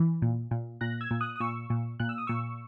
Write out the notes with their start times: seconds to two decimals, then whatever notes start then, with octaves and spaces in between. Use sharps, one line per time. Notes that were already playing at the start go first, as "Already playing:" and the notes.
Already playing: E3
0.22 A#2
0.51 A#2
0.81 A#2 F#6 A#6
1.01 E6 G#6
1.11 A#2
1.21 D#6 F#6
1.36 D#6
1.40 A#2 C#6 E6
1.70 A#2
2.00 A#2 F#6
2.09 E6
2.18 D#6
2.27 A#2 C#6 E6